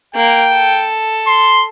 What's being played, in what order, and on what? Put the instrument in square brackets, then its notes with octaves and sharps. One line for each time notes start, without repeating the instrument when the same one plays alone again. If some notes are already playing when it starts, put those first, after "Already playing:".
[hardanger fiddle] A#3 [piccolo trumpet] G5
[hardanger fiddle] A4
[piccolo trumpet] C6